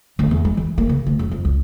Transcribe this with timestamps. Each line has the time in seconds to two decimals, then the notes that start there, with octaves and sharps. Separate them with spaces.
0.19 D2
0.31 E2
0.45 G#3
0.57 E3
0.78 A#3
0.89 C#3
1.06 D2
1.19 F#2
1.31 F2
1.45 C#2